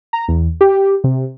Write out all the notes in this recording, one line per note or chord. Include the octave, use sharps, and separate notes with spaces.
A#5
E2
G4
C3